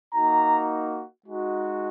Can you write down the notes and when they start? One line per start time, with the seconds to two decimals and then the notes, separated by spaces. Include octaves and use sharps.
0.12 A#3 D#4 F#4 A#5
1.25 G#3 D#4 F#4